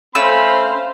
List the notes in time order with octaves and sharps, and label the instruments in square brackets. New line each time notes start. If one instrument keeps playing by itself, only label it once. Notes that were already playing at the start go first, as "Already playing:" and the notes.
[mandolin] A3 C#4 E6 [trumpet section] C4 B5 [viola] C5 F5